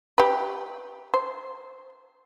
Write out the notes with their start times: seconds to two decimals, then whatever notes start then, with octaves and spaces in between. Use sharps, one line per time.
0.18 G4 B4
1.14 C5